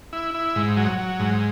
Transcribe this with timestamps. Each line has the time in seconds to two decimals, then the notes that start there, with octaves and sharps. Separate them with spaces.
0.13 E4
0.34 E4
0.56 G#2
0.77 F#3
0.98 F#3
1.19 G#2